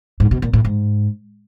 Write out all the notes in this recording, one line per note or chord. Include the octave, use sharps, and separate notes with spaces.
G#2
B2
A#2
A2
G#2